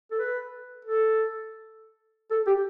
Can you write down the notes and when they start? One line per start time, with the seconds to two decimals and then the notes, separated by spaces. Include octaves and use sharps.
0.11 A4
0.19 B4
0.85 A4
2.31 A4
2.47 G4